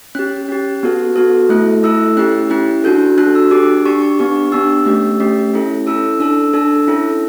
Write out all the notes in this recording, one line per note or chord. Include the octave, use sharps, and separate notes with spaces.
C#4 G4 F#6
C#4 G4
B3 F#4 A4
B3 F#4 A4
A3 E4 A4 F#6
A3 E4 A4 E6
C#4 E4 G4 F#6
C#4 E4 G4 F#6
D4 F#4 A4 G6
D4 F#4 A4 F#6
E6
D4 G4 D6
D4 G4 C#6
C#6
B3 D4 G4 C#6
B3 D4 G4 E6
A3 C#4 G4
A3 C#4 G4
C#4 E4 A4
C#4 E4 A4 E6
D4 A4 E6
D4 A4 E6
C#4 E4 A4